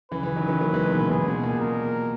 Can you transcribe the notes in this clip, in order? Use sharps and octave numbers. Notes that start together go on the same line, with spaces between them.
C#3 E3 B4
C#3 E3
D#3 F#3
D#3 F#3
F#3 A#3
E3 G#3
B2 D#3
A#2 C#3
A#2 G#4
B2
A#2
A#4